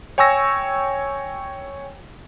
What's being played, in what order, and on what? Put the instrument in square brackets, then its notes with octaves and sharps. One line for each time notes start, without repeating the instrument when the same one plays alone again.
[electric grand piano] C#5 G5 G#5 C#6 E6 A#6